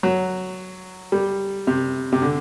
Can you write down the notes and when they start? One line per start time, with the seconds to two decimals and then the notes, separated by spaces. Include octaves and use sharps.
0.03 F#3
1.12 G3
1.67 C3
2.12 C3
2.22 D3